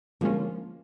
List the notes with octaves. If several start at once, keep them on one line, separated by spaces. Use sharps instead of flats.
D3 F3 G#3 A#3 C#4 F4